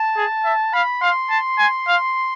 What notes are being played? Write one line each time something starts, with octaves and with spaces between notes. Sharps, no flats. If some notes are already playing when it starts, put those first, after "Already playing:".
Already playing: A5
G#4
E5
F5 B5
F5 C6
A5
G#5
F5